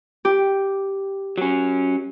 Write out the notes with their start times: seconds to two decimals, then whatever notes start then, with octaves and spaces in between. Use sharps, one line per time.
0.25 G4
1.38 F#3 C#4